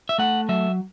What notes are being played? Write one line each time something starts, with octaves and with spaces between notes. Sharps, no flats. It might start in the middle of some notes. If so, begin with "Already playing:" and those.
E5
A3 F#5
F#3 E5